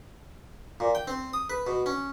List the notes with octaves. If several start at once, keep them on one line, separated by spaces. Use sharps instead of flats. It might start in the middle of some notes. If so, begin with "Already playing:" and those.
A#2
G5
C4
D#6
B4
B2
C#4